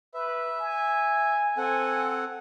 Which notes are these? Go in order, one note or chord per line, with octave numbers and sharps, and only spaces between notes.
B4 E5
G#5
C4 A4 F#5 G#5